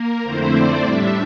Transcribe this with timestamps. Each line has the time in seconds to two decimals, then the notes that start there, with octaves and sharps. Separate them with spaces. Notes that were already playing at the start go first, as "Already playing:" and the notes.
Already playing: A#3 A#4
0.23 F2 D3 A3 C4 E4 C5
0.52 D5
0.81 A2 G3 D4 E5